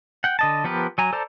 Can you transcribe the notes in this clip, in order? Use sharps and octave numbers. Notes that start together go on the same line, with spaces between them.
F#5 G5
D3 D#5 A5
F3 B3 G4 A#4 B4
F#3 G#5 A#5
A4 C5 D5 A5 A#5